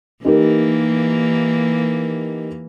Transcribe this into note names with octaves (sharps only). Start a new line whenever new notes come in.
E3 A#3 D#4 G4 A#4